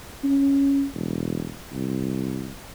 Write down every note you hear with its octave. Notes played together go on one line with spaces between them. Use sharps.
C#4
E1
C2